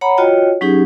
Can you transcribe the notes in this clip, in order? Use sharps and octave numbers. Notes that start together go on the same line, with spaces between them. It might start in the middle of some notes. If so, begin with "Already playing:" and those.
C#5 F#5 A#5 B5
F4 F#4 C#5 D#5 G5
F#3 C#4 D#4 G4 G#4